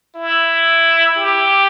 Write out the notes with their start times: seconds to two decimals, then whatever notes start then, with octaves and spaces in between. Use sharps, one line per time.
0.15 E4
1.16 G4